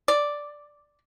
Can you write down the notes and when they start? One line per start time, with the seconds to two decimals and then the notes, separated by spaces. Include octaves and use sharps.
0.08 D5